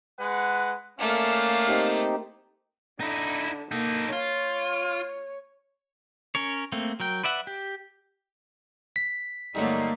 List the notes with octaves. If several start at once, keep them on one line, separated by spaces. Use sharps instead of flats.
G#3 B4 F#5
A3 A#3 C#4 D5 F5
C4 D#4 G4
D3 D#4 E4
A#3 D#4 A4
F4 C#5
C#4 A#4 C#5
A3 A#3 C4
F#3 A#4 G5
B4 D5 E5 F#5
G4
B6
G2 D3 F#3 A3 A#3 D#4